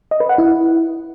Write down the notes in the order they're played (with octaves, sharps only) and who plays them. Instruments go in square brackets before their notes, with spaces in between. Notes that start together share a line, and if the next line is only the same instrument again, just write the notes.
[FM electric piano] D#5
B4
F#5
E4